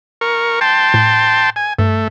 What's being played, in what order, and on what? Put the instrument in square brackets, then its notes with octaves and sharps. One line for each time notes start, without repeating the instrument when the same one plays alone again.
[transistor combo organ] A#4 C#6
G5 A5 C6
[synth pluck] A2
[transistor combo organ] G#5
[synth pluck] G2 [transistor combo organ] A3